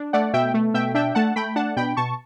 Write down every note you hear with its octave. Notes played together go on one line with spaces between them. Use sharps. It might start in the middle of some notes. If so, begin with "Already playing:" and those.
Already playing: D4
A3 D5 F#5
B2 E5 G5
A3
B2 E5 G5
D4 E5 G5
A3 F#5 A5
A3 G5 B5
D4 F#5 A5
B2 G5 B5
B2 A5 C#6